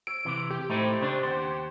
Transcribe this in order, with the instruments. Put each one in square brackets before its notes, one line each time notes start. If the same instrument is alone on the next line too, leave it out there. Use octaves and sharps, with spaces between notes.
[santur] C#5 E6 [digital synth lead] D7
[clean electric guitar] C3 E3
[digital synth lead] G4
[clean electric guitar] A2 A3 D#4 [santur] C4 C5
[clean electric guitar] C#3 D4 [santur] C5
[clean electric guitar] D#2 C5 [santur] C#5 F#5